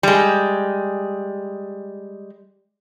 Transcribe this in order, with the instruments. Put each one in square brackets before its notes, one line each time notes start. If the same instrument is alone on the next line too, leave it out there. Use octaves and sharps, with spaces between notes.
[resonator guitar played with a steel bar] G3 G#3